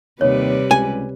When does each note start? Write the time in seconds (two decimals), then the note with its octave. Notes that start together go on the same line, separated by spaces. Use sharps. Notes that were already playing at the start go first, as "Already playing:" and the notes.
0.21 D#2 C3 G3 B4 C#5
0.71 C#2 G#5